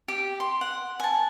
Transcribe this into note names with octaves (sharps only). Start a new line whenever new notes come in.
G4
C6
F#5
G#5 A5